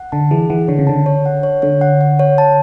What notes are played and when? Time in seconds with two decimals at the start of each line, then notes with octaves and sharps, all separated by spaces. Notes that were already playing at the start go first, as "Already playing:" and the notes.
Already playing: F#5
0.12 D3 A5
0.31 E3 G#4
0.50 E3 F#5
0.68 D3 C#5
0.79 C#3
0.87 D3 A5
1.06 C#5
1.26 F#5
1.43 C#5
1.62 D3 C#5
1.81 F#5
2.01 F#5
2.19 C#5
2.38 A5